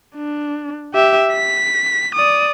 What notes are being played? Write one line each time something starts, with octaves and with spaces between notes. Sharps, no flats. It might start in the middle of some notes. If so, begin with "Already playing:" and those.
D4
G4 E5
B6
D5 D#6